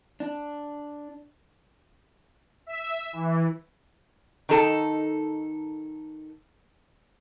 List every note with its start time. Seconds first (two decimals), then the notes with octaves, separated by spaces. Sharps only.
0.20 D4
2.67 E5
3.13 E3
4.49 D#3 D#4 A4